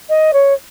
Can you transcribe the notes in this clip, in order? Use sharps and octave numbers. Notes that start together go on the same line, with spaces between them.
D#5
C#5